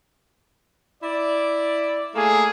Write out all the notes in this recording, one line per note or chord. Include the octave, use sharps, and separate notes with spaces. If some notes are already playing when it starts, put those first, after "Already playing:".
E4 D5
A3 A#3 G#4